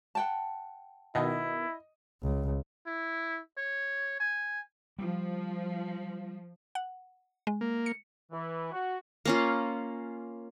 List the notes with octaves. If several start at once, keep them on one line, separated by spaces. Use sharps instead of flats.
F#5 G5 A5
B2 D#3 E4 D#5
C#2
E4
C#5
G#5
F3 G3
F#5
G#3
A#3
C#7
E3
F#4
A#3 C#4 F4